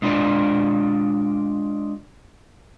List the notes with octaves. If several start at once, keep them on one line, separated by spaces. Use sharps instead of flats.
G#3 D4 F4 D5